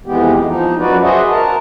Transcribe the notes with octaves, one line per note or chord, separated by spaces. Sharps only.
F2 E3 G#3 B3 G4
F3 D#4
F#2 F#4 B4 D5
F#4 G#4 C5 D#5 E5 F#5
A#4 A5